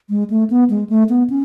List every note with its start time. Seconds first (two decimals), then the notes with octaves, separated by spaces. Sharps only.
0.10 G#3
0.30 A3
0.50 B3
0.70 G#3
0.90 A3
1.09 B3
1.30 C#4